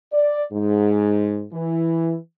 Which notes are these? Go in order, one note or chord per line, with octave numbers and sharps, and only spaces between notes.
D5
G#2
E3